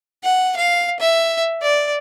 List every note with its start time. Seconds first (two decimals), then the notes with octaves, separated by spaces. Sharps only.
0.24 F#5
0.56 F5
1.00 E5
1.62 D5